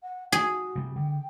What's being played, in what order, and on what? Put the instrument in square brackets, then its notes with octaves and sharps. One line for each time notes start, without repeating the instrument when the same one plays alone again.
[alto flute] F#5
[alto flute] F#4 [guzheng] G#4
[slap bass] C3 G3
[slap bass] D3 [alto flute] G5